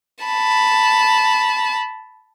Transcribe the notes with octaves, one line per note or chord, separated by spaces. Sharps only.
A5 B5